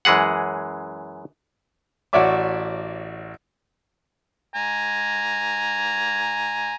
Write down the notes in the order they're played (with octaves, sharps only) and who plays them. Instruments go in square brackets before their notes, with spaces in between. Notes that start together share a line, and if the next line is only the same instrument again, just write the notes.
[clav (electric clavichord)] F#2 E3 G#3 G#4 F#5
[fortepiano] A1 F#4 C#5 D5 E5 D6
[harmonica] G#5 A#5